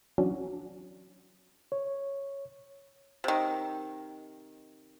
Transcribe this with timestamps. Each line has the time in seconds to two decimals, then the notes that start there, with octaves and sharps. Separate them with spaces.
0.18 E3 F#3 C#4 D4 F#4
1.72 C#5
3.24 C3 D#3